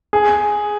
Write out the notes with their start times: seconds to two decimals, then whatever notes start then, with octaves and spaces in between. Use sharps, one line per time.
0.13 G#4